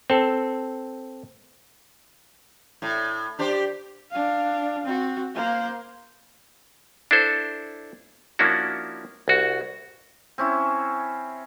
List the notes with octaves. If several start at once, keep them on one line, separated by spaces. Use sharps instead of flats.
C4 A4
A2
D4 G4 C5
D4 F5
C4 F#4
A#3 C5
D4 E4 A4 C5
F3 A#3 C#4 D4 E4 F#4
C2 F#4
C4 C#4 E4